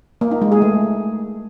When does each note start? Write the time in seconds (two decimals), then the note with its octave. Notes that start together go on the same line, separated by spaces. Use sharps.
0.21 A#3
0.31 D#4
0.42 G#3
0.52 G#4
0.62 A3